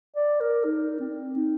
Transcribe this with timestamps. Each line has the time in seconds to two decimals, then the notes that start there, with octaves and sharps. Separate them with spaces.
0.16 D5
0.40 A#4
0.64 D#4
1.00 C4
1.37 D#4